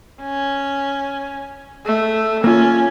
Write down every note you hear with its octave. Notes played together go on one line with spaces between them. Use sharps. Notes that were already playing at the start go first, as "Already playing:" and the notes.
C#4
A3
A#3 C#4 F4